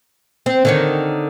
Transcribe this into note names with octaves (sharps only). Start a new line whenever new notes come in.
C4
D3 D#3 C#5